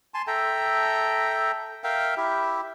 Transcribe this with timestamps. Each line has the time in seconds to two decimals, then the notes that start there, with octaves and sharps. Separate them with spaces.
0.14 G#5 A5 C6
0.27 A4 E5 G5 A#5
1.84 A#4 E5 F5 G5
2.17 E4 G4 E5